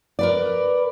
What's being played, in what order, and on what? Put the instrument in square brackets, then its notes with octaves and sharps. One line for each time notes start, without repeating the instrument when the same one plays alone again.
[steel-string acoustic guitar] A#4 B4 D5